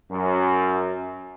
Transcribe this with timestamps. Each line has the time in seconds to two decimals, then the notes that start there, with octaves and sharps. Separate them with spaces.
0.11 F#2